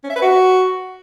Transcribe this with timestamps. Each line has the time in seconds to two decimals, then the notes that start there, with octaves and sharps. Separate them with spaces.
0.04 C#4
0.10 E5
0.16 B4
0.22 F#4